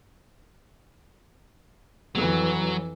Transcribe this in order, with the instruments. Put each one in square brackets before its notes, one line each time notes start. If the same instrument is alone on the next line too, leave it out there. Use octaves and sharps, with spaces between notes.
[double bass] F2 E3 [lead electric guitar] F#3